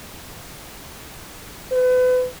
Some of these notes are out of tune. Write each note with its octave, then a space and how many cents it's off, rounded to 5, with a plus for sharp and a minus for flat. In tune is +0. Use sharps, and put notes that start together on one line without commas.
B4 +35